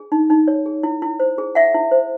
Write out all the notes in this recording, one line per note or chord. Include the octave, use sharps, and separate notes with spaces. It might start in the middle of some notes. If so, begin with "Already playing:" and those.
Already playing: G#4
D#4
D#4
C#5
G#4
E4
E4
C5
G#4
E4 E5 F#5
E4
C5